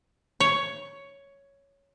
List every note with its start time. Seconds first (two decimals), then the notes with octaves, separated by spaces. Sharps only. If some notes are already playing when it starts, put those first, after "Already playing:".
0.40 C#5